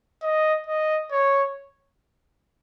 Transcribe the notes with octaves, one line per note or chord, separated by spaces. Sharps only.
D#5
D#5
C#5